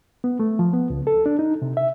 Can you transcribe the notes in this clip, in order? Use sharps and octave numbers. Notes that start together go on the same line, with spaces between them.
B3
A3
F3
B3
C#2
A4
D4
D#4
C3
E5